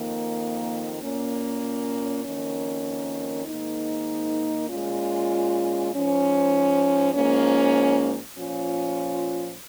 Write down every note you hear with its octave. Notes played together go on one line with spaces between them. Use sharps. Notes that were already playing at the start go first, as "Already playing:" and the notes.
Already playing: F2 D#3 A#3
A#2 A#3 C#4
F2 D#3 A#3 C#4
G#2 D#3 A#3 D#4
A#2 G#3 C#4 F4
G#2 F3 C#4
G#2 F3 A#3 C#4
A#2 F3 C#4 F4